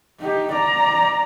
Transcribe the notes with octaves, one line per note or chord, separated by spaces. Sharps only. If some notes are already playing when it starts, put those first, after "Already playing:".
D#4 G4
D5 A#5